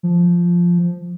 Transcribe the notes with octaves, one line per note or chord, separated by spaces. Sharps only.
F3